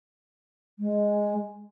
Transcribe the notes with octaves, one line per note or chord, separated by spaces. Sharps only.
G#3